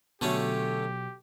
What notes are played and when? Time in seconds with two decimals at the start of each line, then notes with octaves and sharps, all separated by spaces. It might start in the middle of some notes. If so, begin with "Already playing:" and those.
0.21 B2 D3 F#3 A3 C#4 G4